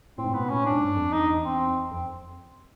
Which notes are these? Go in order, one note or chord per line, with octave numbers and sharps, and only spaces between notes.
A2 C4
G#2
A2
B3
B2
A#2 C#4
A2
G#2 D4
G2
F2
E2 D#4
C4
F2 C4